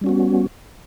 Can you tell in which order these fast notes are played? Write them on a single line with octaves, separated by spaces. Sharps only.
G3 C#4 F#4 B3